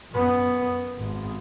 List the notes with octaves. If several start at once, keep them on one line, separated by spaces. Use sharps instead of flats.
F#2 B3
G#1